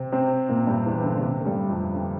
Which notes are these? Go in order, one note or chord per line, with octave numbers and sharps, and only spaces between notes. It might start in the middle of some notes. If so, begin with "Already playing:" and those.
Already playing: C3 C4
C3 C4
A#2 A#3
G2 G3
E2 E3
D3
D3
C3
A3
G2 G3
F2 F3
D3